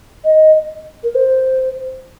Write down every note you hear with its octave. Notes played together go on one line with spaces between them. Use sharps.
D#5
A#4
C5